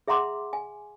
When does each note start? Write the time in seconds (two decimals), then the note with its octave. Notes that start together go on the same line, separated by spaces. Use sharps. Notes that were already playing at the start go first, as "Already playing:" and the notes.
0.08 G#4 E5 F#5 A#5 C6 D6
0.53 G#5